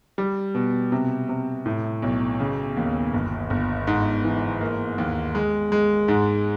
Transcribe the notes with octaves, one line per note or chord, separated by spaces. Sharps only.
G3
B2
C3
C3
A2
B1
C#3
D#2
G1
G1
G#2
E3
A#3
D#2
G#3
G#3
G#2